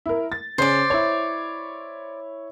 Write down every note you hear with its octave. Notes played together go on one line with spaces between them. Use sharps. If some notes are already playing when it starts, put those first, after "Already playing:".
E4 A#4
A6
C#3 C#4 C5 D5
E4 C#5